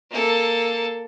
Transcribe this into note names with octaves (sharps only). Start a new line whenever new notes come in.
A#3 A4